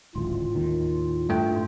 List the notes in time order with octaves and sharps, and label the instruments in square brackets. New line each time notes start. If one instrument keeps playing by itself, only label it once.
[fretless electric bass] D1 G#1 C#2 [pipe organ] A2 F4
[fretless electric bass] D#2 D#3
[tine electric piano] G2 A3 G5